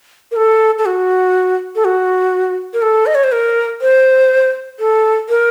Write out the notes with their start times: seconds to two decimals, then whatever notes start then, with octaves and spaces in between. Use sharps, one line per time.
0.31 A#4
0.36 A4
0.78 A4
0.86 F#4
1.75 A4
1.85 F#4
2.74 A#4
2.82 A4
3.06 D#5
3.15 C#5
3.24 C5
3.32 A#4
3.81 C5
4.80 A4
5.29 A#4